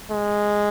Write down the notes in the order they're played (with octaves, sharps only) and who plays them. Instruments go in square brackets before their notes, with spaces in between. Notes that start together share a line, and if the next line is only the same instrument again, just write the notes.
[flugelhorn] G#3